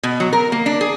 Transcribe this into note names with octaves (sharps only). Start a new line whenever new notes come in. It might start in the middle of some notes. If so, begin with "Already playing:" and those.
B2
F#3
A#4
A#3
D4
G#4